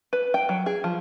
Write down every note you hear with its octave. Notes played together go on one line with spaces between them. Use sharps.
B4
G5
F#3
G#4
F3